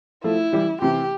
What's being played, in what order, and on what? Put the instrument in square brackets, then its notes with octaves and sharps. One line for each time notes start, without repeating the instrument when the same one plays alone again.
[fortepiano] F3 A3 [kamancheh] E4
[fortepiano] E3 G3
[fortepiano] C3 E3 [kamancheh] G4